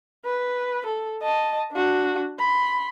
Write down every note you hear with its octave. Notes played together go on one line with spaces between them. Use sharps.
B4
A4
D#5 A5
D4 F#4
B5 C6